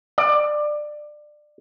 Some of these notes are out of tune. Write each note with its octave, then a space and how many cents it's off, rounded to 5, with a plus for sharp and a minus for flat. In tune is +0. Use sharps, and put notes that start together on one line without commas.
D5 +20